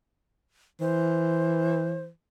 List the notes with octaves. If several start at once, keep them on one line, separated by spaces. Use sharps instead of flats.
E3 C5